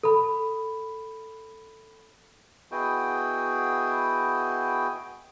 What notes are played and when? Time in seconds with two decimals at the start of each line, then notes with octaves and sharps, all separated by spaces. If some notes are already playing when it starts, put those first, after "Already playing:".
0.03 A4 B5
2.71 B3 E4 F#4 G#4 D#5 G5